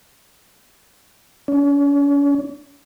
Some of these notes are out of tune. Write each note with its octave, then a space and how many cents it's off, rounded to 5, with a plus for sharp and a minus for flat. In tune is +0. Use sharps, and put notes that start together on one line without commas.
C#4 +40